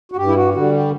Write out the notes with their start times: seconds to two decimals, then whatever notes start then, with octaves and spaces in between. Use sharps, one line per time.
0.12 F#4
0.16 G2 G4
0.28 E4
0.36 F#4
0.54 D3 G3 F#4
0.73 G4